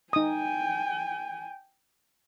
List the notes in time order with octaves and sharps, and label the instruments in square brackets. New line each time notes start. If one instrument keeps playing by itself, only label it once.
[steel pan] D#4 D#6 [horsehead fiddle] G5 G#5